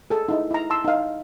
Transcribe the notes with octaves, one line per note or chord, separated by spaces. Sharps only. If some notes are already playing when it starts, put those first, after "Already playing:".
G#4 A4
D#4 E4 G#4
E4 A#5
A5 C6 E6
D#4 F5